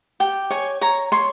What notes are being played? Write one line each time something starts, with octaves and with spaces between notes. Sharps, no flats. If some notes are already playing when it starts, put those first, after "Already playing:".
G4 G5
C#5 G#5
C#5 A#5
C#5 C6